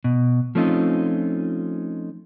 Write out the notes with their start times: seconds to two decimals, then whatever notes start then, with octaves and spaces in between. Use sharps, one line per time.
0.04 B2
0.55 F3 A3 C4 C#4 D#4 F4